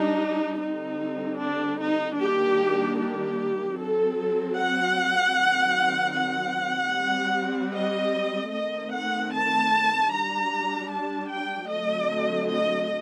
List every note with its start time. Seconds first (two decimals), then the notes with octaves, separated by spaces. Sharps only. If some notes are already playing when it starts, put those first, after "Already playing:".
Already playing: G3 D4 D#4
0.61 D3 G3 C4 D#4
1.40 D4
1.79 D#4
2.19 D#3 G3 A#3 D4 G4
2.98 G4
3.77 F#3 C4 A4
4.57 F#5
5.36 D#3 F#3 C4
6.15 F#5
6.95 G3 C4
7.73 D#5
8.53 D#3 A3 C4 D#5
8.92 F#5
9.32 A5
10.11 G3 D4 A#5
10.90 A5
11.30 G5
11.69 D3 F#3 A3 C4 D#5
12.48 D#5